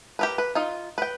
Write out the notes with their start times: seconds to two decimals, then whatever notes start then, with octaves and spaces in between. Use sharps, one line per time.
0.19 G4 A#4 B4
0.38 B4
0.55 D#4 F4
0.98 B4 G5